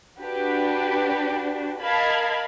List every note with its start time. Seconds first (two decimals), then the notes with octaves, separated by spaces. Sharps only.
0.21 D4 F#4 G4 B4
1.81 A#4 D#5 F5 A5 B5 G#6